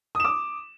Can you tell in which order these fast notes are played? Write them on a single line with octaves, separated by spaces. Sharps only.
D#6 E7 D6